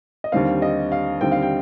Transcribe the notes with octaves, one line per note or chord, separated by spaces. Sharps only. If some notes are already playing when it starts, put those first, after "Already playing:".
D#5
D#2 D3 G3 C4 F5
D#5
F5
D#2 D3 G3 C4 G5
F5
G5